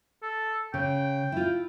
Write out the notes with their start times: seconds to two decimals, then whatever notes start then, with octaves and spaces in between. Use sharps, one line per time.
0.23 A4
0.74 C#3 G5
1.32 E4 F4